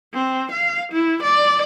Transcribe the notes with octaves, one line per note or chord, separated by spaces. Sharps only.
C4
F5
E4
D5